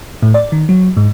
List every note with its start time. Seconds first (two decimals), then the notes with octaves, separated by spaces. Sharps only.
0.22 A2
0.34 D5
0.52 D#3
0.69 F#3
0.97 G#2